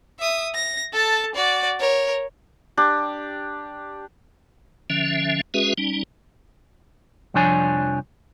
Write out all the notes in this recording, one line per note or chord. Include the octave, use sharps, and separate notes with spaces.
E5 D#6
A#6
A4 A5
F#4 D5
A#4 C#5
D4 G4
D3 F3 C#4 E5
G#3 C#4 F#4 G#4 B4 E5
G3 C#4 D#4
C2 F2 F3 D4 C#5 G#5